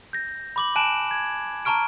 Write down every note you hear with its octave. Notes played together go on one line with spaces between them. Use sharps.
G6 A#6
B5 D6 F#7
G#5 A5 F#6 D7 E7 F#7
G#6
A5 A#5 C#6 F6 D7